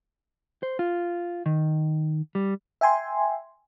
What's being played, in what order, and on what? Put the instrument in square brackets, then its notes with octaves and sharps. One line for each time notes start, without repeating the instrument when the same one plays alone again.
[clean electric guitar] C5
F4
D#3
G3
[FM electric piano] E5 G5 G#5 C6